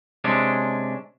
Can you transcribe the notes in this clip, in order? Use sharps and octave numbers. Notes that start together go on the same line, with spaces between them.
C3 G#3 C#4 D4